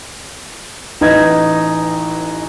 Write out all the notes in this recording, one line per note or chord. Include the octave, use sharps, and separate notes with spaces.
A1 D#4 B4 D#5 G#6